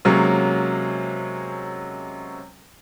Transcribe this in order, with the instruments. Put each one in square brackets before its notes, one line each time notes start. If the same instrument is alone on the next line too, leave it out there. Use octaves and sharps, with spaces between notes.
[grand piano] C3 F#3 G#3 A#3 C#4